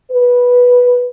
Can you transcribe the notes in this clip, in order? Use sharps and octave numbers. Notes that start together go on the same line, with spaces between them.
B4